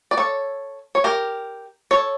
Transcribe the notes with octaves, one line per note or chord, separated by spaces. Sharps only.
D5
A4 C#5
C#5
G4 A#4
A4 C#5